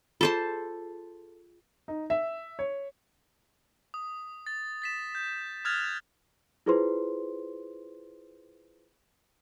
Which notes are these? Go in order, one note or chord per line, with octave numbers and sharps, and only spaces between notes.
F4 G#4 A4 C5 A5
D#4
E5
C#5
D#6
A6
A6 B6 E7
G6
D#6 F6 F#6 G#6 A6 F7
E4 F4 G#4 B4 C5 C6